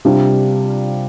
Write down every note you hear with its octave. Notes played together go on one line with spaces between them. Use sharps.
C3 G3 D4 F4